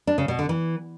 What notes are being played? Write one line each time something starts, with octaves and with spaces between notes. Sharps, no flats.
D4
C#3
B2
D3
E3